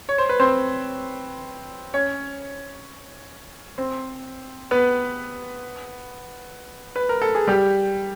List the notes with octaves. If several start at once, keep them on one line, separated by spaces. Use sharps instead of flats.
C#5
C5
B4
C4 C5
C#4 C#5
C4 C5
B3 B4
B4
A#4
A4
G#4
G3 G4